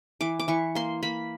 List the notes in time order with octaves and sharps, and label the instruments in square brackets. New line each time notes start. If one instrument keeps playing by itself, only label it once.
[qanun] E3 D6
D6
E3 C#6
A#3 C6
A#3 B5